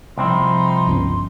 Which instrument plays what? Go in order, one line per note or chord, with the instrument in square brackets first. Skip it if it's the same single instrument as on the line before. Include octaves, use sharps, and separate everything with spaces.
[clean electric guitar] C2 C4 E4 [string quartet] F3 D#4 [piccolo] C6
[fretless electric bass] G1 C#2 C#4